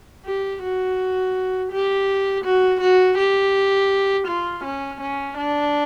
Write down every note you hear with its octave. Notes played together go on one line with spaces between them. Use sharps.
G4
F#4
G4
F#4
F#4
G4
F4
C#4
C#4
D4